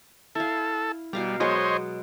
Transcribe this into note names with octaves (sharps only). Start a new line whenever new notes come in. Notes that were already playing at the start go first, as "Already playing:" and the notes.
E4 A4 F5
B2 G3 F5 A#5
F#3 G#3 B3 C5 C#5 D#5